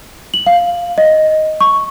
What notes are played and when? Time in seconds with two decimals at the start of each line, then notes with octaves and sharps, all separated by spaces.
0.34 F#7
0.46 F5
0.98 D#5
1.61 C#6